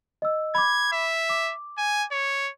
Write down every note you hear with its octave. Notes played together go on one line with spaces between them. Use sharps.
D#5 E6
B5 D6 G#6
E5
D6
G#5
C#5